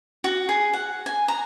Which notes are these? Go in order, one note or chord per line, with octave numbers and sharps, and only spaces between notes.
F#4
G#4
F#5
G#5
A#5